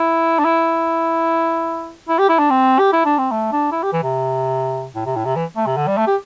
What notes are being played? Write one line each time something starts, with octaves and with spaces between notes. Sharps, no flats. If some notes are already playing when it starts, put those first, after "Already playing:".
Already playing: E4
D4
E4
E4
G4
E4
D4
C4
G4
E4
D4
C4
A3
D4
E4
G4
E3
C3
A2
C3
A2
C3
E3
A3
C3
D3
G3
A3
G4